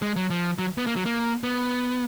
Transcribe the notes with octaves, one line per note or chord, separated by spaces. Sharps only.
G#3
F#3
F3
F#3
B3
A#3
F#3
A#3
B3